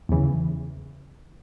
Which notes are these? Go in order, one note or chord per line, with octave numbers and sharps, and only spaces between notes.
E2 C#3 E3